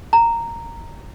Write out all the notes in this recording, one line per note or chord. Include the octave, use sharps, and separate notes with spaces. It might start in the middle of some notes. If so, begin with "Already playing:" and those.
A#5